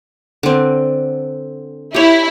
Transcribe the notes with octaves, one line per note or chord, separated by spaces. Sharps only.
D3 C4
E4 G4 C#5